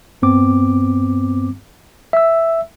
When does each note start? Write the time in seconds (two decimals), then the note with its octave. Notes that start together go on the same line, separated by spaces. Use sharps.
0.22 G2 B3 C4 D6
2.13 E5 E6